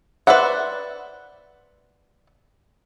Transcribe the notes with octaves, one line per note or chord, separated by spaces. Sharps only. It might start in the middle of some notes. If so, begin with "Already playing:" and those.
B4 C5 D5 E5 F#5